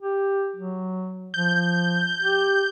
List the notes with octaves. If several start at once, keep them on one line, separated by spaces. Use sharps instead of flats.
G4
F#3
F3 G6
G4